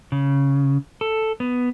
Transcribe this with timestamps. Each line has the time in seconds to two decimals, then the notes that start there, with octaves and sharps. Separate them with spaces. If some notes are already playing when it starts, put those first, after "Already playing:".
0.12 C#3
1.01 A4
1.40 B3